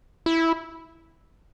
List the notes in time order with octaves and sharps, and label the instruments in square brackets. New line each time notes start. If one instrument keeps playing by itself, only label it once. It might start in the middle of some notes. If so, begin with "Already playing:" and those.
[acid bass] E4